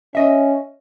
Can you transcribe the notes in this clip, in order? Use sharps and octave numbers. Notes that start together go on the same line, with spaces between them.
C#4 D#5 E5